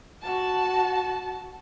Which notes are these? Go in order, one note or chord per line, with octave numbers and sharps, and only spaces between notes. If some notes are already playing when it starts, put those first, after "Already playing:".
F#4 A5